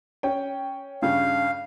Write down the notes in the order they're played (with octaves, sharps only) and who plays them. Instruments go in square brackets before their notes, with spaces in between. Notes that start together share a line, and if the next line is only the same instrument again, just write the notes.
[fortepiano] C#4 G5
[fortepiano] G2 C#3 [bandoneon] F5